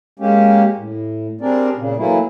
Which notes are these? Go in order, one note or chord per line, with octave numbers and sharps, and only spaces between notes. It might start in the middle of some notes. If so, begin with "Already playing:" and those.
G#3 A#3 C#4 G4
A2
G3 C4 D4 G#4 A#4 D5
A#2 C#3
E3 F#3 A3 A#3 E4